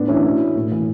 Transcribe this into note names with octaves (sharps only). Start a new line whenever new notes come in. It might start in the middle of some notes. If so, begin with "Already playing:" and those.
Already playing: A2 B3 D4
E3 C#4 E4
B2
A2
E3